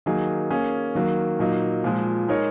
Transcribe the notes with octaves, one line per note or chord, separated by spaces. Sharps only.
D#3 F#3 A#3 D#4 G#4
A#3 C#4 G#4
D#3 F#3 A#3
A#2 F#3 A#3 D#4
A#2 F3 G#3
G#3 D#4 A#4 C#5